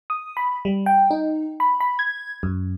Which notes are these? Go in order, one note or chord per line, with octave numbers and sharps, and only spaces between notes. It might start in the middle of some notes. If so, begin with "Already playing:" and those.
D#6
B5
G3
G5
D#4
B5
B5
G#6
F#2